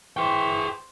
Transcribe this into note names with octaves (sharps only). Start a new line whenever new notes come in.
E3 G#4 C5 G5 C#6